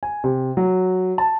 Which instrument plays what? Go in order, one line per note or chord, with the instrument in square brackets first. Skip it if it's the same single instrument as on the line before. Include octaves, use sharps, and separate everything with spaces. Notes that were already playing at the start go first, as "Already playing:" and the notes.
[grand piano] G#5
C3
F#3
A5